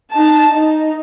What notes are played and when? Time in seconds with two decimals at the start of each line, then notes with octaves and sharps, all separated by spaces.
0.11 D#4 A5
0.49 D#4